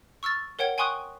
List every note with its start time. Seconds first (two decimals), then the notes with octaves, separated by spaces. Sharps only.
0.23 C#6 E6 F6 A6
0.59 A#4 C#5 F#5 G5 G#6
0.78 G5 G#5 C6 C#6 D#6 F#6